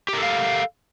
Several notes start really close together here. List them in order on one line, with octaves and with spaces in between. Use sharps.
G4 A#4 A4 F5